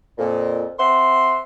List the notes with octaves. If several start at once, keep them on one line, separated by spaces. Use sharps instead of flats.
F2 A#2
C4 E5 F#5 C6